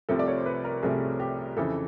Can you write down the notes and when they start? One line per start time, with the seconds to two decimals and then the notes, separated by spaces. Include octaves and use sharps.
0.09 C2 C3 F3 A3 A4
0.19 D5
0.28 C#5
0.37 C5
0.46 B4
0.64 A#4
0.83 C2 C3 F3 A3 G#4
1.20 G4
1.57 F2 C#3 E3 A4